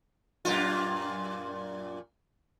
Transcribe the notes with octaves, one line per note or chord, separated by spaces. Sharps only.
F#2 A#2 F4